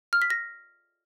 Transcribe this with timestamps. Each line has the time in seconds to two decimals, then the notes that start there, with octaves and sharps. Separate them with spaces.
0.13 F6
0.22 B6
0.30 A#6